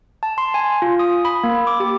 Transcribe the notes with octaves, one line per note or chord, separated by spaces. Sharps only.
A5
C6
G#5
F4
D#6
B5
A#3
D6
G4